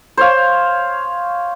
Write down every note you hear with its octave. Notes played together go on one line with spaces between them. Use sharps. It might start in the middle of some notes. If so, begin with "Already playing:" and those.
C5 C#5 F5